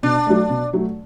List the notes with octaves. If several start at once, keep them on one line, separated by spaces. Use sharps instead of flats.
B2 D4
F#3 A3
B2
F#3 A3